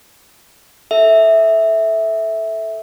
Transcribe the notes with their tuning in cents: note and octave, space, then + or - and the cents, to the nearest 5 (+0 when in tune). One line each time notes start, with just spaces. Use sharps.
A4 +0 E5 -10